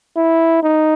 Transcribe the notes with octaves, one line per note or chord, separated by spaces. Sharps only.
E4
D#4